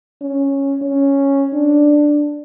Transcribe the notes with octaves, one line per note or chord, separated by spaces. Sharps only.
C#4
C#4
D4